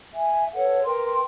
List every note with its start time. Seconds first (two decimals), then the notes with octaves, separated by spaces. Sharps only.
0.14 E5 G#5
0.54 A4 B4 C#5 F#5
0.84 A#4 B4 G5 C6